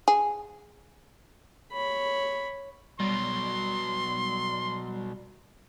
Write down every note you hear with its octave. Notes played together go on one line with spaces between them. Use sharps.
G#4
C#5 B5
B2 F#3 G3 C6